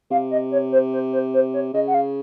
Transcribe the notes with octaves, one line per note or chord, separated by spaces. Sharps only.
C3 F5
D#5
C#5
C5
C5
C5
C5
C#5
C#3 D#5
F#5
F5